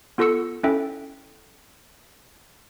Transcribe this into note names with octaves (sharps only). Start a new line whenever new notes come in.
B3 F4 A4 C#6 E6 C#7
C#4 E4 A4 E5 G5